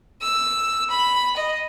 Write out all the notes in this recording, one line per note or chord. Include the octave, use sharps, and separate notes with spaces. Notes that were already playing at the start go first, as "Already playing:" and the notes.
E6
B5
D#5